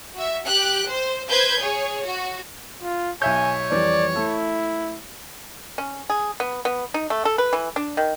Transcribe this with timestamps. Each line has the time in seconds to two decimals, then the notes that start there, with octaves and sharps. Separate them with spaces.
0.14 F#4 E5
0.46 G4 G5 F#6
0.87 C5
1.28 B4 C5 G6 G#6
1.60 G#4 C#5
2.05 F#4
2.83 F4
3.22 B1 C#5 E5 G#5 G6
3.71 F2 E3 G3 D5
4.16 A3 E4 A4
5.78 C#4
6.10 G#4
6.40 B3
6.65 B3
6.94 D#4
7.10 A3
7.25 A4
7.38 B4
7.53 E3
7.76 D4
7.97 D#3